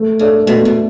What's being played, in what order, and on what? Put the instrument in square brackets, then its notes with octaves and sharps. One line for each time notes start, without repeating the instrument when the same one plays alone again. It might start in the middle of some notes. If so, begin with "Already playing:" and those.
Already playing: [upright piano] A3
[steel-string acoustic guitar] C#3 [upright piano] D4 A4 D5
[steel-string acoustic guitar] B2 [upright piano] A3
[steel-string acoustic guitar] B2